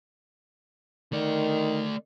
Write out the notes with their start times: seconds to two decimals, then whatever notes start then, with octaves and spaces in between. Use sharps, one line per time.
1.13 D#3 A3 D5